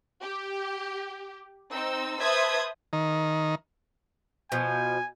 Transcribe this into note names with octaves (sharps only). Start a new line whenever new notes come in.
G4
C4 D#4 E6
B4 C5 E5 A5 D#6 G#6
D#3
B2 F3 G#5